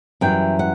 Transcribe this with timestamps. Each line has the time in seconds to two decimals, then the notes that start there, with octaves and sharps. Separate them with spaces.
0.21 F#2 E3 G3 G5
0.59 F#5